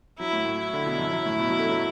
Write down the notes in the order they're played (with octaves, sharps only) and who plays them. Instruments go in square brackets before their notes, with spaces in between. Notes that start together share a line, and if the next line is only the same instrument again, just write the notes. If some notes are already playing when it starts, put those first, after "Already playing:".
[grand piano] F#3 [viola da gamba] E4
[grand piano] A2
A2
[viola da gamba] E4
[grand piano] D3
B2
F#2
F#2
A2
B2
F#3
A3
F#3